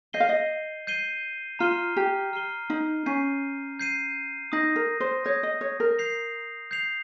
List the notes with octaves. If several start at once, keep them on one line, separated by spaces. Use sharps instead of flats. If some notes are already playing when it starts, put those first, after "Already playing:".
D#5 G6 C7 D#7 G7
F5
D#5
G6 C7 D#7 G7
F4 A#5 F6 C7 D#7 G7
G4
A#5 F6 C7 D#7 G7
D#4
C#4 G6 C7 D#7
G6 C7 D#7
D#4 D#6 G6 A#6
A#4
C5
C#5 D#6 G6 A#6
D#5
C#5
A#4
G6 C7 F7
G6 C7 F7